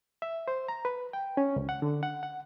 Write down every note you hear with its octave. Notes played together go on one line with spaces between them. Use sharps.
E5
C5
A#5
B4
G5
C#4
C#2
F#5
D3
F#5
F#5